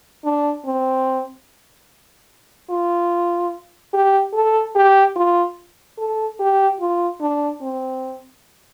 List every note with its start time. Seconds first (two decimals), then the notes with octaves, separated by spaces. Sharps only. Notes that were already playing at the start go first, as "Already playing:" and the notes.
0.24 D4
0.65 C4
2.70 F4
3.93 G4
4.34 A4
4.75 G4
5.16 F4
5.98 A4
6.39 G4
6.80 F4
7.21 D4
7.62 C4